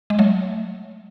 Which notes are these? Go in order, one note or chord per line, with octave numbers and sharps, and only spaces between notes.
G#3
F#3 A3